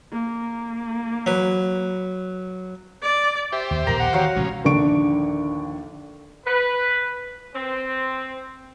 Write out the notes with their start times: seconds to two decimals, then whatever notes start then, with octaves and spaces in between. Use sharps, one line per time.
0.12 A#3
1.26 F#3 B4
3.03 D5
3.52 G4 C5 E5
3.71 D#2
3.87 A#1 D#2 A#4 A#5
3.99 F#5
4.13 D#3 E3 F#3 C#5 F5
4.36 A1 C3 G#3 C#4
4.64 A#1 D#2 D3 D4 C#6 D7
6.46 B4
7.55 C4